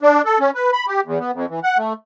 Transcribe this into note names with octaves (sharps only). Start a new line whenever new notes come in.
D4
A4
C#4
B4
B5
G4
E2
B3
F2
E3
F#5
A3